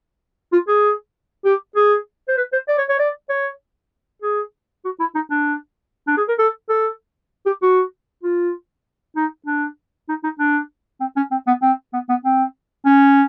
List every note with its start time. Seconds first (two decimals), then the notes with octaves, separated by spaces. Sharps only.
0.53 F4
0.68 G#4
1.45 G4
1.76 G#4
2.28 C5
2.37 B4
2.53 C5
2.68 D5
2.78 C#5
2.89 C#5
2.99 D5
3.29 C#5
4.22 G#4
4.85 F#4
5.00 E4
5.15 D#4
5.31 D4
6.08 D4
6.17 G#4
6.28 A#4
6.39 A4
6.69 A4
7.46 G4
7.62 F#4
8.23 F4
9.16 D#4
9.46 D4
10.09 D#4
10.24 D#4
10.39 D4
11.00 C4
11.17 C#4
11.31 C4
11.47 B3
11.62 C4
11.93 B3
12.09 B3
12.25 C4
12.86 C#4